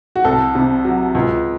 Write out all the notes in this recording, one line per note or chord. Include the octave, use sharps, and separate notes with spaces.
F#4
C2 A4
C3
F#3
C#2